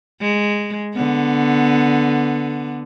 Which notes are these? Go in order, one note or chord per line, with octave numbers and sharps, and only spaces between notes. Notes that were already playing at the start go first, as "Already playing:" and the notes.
G#3
D3 B3